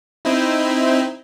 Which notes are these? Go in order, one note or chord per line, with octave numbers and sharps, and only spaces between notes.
C4 D#4 E4